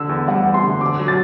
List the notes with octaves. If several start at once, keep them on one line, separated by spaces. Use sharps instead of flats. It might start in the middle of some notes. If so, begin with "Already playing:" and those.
Already playing: D3 E6
E2
G3 F#5
E2
C6
D3
D3 D6
F#3
A6